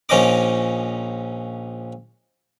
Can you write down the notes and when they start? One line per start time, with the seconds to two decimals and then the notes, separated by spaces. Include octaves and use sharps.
0.09 A#1 F3 C#4 D#4 D#5 D6